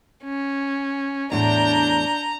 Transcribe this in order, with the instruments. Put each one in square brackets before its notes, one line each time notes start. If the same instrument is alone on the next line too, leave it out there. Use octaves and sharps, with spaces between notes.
[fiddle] C#4
[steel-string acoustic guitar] E2 A2 [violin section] D4 G6 [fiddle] A#5